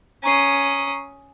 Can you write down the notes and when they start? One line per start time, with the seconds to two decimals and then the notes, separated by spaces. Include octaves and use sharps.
0.24 C#4 A#5 C#6 D#6 C7